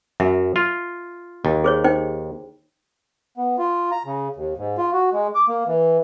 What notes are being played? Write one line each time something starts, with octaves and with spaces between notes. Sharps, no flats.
F#2 E5
F4
D#2
G#4 C5 C#5
D#4 C5 G5
B3
F4
A#5
C#3
D#2
G#2
F4
F#4
G#3
D6
A#3
E3